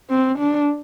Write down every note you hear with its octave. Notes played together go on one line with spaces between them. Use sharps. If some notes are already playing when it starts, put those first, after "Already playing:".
C4
D4